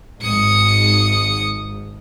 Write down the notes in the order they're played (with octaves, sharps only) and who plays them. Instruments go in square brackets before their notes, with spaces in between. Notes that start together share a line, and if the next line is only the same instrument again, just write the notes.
[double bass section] G#1 G#2 [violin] D#6 C#7